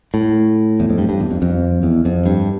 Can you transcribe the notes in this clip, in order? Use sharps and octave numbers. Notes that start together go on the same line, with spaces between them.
A2
E2
F2
G2
G2
E2
F2
F2
E2
F2
G2